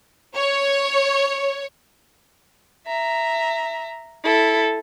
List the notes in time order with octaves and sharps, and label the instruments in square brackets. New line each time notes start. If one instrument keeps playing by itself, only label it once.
[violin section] C#5
[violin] E5 A#5
E4 A4